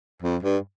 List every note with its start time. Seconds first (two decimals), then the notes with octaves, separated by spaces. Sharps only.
0.22 F2
0.43 G2